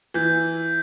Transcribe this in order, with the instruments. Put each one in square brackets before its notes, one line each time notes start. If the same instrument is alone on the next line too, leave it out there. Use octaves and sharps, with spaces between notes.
[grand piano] E3 [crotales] G6